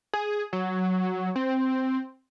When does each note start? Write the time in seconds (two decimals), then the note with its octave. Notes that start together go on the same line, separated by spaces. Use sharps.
0.13 G#4
0.53 F#3
1.36 C4